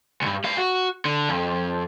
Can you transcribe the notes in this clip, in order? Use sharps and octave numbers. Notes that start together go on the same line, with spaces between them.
C2 G2
G3 F5
F#4
D3
F2